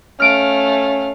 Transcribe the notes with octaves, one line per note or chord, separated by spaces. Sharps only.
A3 C#4 F5 F6 D7